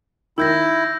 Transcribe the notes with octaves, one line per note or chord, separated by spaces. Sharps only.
D#3 E4 E6 G6 A#6